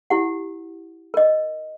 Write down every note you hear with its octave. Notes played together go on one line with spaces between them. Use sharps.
E4 G4 F#5
A#4 D#5